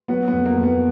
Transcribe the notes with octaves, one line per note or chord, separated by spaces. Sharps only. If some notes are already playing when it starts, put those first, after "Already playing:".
F#3 B3
B3
F2
A#3
F2
B3